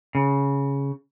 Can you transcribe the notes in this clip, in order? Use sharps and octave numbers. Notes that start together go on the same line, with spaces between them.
C#3